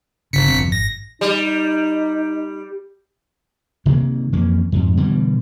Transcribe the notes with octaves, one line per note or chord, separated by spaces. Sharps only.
G1 C#3 B6 C#7
F#2 C3
G1 F2
G#1 A#6
G3 D#4
C3 D#3 F#3 A#3
F2 E3 A#3 C#4
F2 G#2
B2 D3 E3 G3